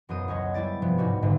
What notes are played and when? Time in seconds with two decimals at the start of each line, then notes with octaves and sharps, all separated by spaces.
0.09 E1 F#2 B3 C5 D#6 D#7
0.28 C#2 B3 C#5 D#5 F#5
0.54 G3 E4 D5 A6
0.82 G2 C3 F3 B3
0.98 C#2 G#2 G3 F#4
1.22 D#1 G#1 G#2 D3